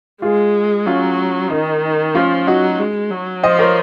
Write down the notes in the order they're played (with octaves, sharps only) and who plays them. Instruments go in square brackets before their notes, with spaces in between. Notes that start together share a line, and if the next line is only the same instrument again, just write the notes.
[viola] G#3 [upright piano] F4 G#4
[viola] F#3 [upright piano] C#4 F4
[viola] D#3 [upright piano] D#4
[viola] F3 [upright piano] C#4 F4
[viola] F#3 [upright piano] D#4 F#4
[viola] G#3
F#3
[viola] F3 [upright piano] C5 D#5
[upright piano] A#4 C#5